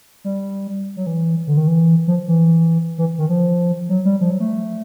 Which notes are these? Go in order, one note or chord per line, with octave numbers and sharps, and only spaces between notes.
G3
F#3
E3
D3
D#3
E3
F3
E3
E3
D#3
F3
F#3
G3
F3
F#3
A3